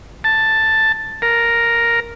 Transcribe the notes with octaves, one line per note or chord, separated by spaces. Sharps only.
A5
A#4